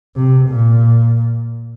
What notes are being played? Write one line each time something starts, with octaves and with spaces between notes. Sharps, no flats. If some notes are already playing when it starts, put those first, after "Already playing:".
C3
A#2